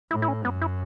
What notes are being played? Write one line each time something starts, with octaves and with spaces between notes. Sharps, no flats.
A2 E4
E4
C#4
F#2 B3
E4